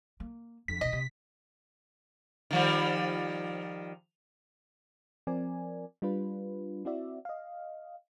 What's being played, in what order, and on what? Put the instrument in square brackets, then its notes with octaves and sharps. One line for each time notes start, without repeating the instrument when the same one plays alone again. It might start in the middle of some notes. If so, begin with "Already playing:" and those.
[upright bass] A#3
[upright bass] F2 D3 [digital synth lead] B6
[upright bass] B2 D#3 [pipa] D#5
[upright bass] C3
[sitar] D#3 F3 G3
[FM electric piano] F3 C4 A#4 D5 G#5
G3 D4 F4 B4
C4 E4 F#4 D5 E5
D#5 F5